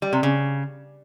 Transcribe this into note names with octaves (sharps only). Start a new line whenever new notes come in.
G3
C3
C#3